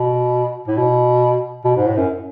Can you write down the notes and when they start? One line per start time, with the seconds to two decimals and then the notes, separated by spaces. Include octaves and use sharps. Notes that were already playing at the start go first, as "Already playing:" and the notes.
Already playing: B2
0.68 A2
0.77 B2
1.64 B2
1.76 G#2
1.87 A2
1.97 F#2